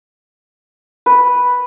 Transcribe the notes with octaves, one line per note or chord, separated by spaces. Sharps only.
B4